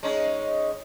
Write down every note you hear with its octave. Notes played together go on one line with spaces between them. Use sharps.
G#3 C#4 D#4